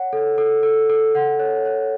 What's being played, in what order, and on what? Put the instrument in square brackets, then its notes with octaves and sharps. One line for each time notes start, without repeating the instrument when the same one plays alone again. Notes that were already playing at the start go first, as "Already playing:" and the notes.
Already playing: [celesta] C#5 F#5
A4
A4
A4
A4
F#5
C#5
C#5